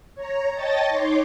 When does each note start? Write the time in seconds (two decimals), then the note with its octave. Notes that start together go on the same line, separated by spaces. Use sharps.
0.15 C#5 A#5
0.54 C#5 D#5 G5 A5 A6 A#6
0.88 D#4 C#5 C6 D6